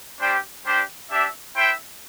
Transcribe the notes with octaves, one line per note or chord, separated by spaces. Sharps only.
G3 D4 G4 C5 G5
G3 D4 G4 C5 G5
D4 G4 E5
E4 C5 E5 G5